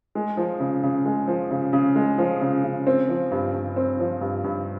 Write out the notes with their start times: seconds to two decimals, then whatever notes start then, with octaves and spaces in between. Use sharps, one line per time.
0.15 G#3
0.37 F3
0.60 C#3
0.83 C#3
1.06 G#3
1.27 F3
1.51 C#3
1.73 C#3
1.96 G#3
2.18 F3
2.41 C#3
2.64 C#3
2.87 C4
3.09 F3
3.31 G2
3.54 G2
3.76 C4
4.00 F3
4.21 G2
4.44 G2